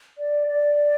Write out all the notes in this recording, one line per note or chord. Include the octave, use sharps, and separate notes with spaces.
D5
D5